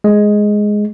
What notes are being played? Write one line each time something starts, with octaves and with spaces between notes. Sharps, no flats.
G#3